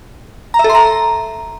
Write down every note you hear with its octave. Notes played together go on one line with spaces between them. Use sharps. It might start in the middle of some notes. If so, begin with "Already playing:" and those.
A#5
E5
A4
C6
A#5